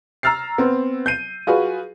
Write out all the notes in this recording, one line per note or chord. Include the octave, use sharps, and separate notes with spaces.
A#5 E6 F6 A6 C7
B3 C4
G6 C7 D#7
F4 F#4 G#4 B4